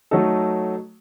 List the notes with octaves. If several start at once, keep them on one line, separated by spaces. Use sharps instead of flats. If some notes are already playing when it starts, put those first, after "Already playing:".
F#3 A3 D#4 A4